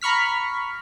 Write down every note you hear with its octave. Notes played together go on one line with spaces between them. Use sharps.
A#5 B5 C#6 F6 B6